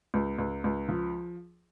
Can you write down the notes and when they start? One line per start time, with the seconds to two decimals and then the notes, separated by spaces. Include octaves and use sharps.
0.14 C#2
0.38 C#2
0.64 C#2
0.89 F3